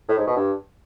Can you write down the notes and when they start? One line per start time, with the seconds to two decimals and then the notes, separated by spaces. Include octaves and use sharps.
0.09 A2
0.18 G#2
0.27 B2
0.36 G2